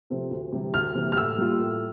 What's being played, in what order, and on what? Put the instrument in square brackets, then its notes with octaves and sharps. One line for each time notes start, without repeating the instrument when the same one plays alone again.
[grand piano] C3 F3 A3 C4
D2
C3 E3 G3
[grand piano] D2 [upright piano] F6
[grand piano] C3 E3 G3 A#3
[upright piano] F6
[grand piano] A2 [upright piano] E6
[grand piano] G3 A#3 F4
A2